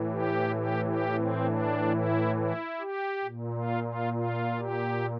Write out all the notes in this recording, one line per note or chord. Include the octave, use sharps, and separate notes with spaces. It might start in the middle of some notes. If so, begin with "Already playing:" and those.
Already playing: A2 E3
G4
G4
G4
C4
D4
E4
E4
G4
A#2
F4
F4
F4
G4